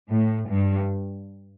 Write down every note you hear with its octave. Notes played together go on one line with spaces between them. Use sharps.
A2
G2